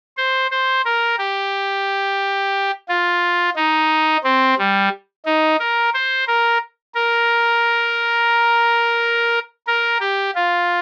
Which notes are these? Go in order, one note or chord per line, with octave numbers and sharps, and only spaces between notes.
C5
C5
A#4
G4
F4
D#4
C4
G3
D#4
A#4
C5
A#4
A#4
A#4
G4
F4